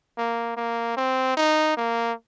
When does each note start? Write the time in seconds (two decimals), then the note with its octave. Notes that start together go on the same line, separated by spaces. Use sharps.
0.17 A#3
0.57 A#3
0.97 C4
1.37 D#4
1.77 A#3